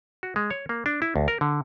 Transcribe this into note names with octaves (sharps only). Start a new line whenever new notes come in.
F#4
G#3
C#5
A#3
D4
E4
D2
A#4
D3